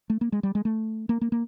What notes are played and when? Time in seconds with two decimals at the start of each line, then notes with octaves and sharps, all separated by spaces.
0.10 A3
0.21 A#3
0.32 G#3
0.43 G3
0.55 G#3
0.65 A3
1.09 A#3
1.21 A#3
1.32 A#3